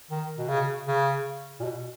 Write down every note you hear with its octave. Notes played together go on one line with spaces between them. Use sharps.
D#3
B2
C#3
C#3
A#2
B2